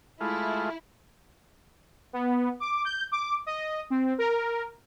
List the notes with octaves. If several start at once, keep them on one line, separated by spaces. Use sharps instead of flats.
G#3 A3 E4 F4
B3
D6
G6
D6
D#5
C4
A#4